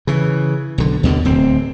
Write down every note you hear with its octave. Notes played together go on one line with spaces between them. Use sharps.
C#3 E3
B1 D3
D#2 B2 D3
D1 C4